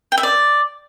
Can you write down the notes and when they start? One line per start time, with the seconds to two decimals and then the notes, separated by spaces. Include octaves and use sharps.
0.12 G5
0.18 E5
0.23 D5